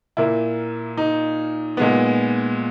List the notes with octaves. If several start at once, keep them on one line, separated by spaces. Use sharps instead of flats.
A#2 A#3 E4
D#4
A#2 G#3 B3